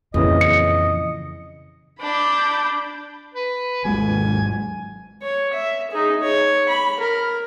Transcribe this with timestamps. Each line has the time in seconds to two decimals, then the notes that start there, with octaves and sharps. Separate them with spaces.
0.14 F2 A#2 C#3 E3 D#5 D#6
0.41 C#7
2.00 D4 B5 G6
3.34 B4
3.84 G#1 F#3 G#3 G#5
5.23 C#5
5.53 E5
5.91 D#4 G#4
6.21 C#5
6.69 B5
7.00 A#4